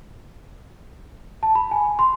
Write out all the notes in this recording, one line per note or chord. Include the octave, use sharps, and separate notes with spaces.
A5
B5
G#5
C6